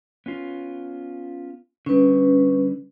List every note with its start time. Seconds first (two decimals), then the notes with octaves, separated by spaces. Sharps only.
0.26 B3 C#4 F4
1.86 D3 G3 C#4 B4